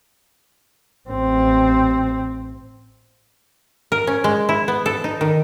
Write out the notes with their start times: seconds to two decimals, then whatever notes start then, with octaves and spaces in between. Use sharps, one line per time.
1.10 A1 C4
3.92 A#4
4.07 C#4
4.24 G#3
4.49 E4
4.68 B3
4.86 A4
5.04 D#4
5.21 D#3